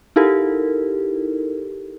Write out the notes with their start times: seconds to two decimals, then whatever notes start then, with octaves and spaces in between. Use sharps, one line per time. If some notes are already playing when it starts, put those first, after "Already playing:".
0.16 D#4 E4 G4 A4 A#4